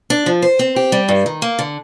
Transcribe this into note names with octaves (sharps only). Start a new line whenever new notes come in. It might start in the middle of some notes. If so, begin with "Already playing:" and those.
D4
F3
C5
C4
G4
G3
G2
D#3
A#3
D3